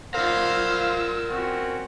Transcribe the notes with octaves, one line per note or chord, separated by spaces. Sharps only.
F4 A#4 C5 D5 F5 F#5 E6
C4 C#4 F#4